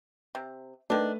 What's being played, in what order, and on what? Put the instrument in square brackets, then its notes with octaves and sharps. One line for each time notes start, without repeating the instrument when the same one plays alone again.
[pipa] C3
[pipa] D#3 D4 [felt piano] A3 B4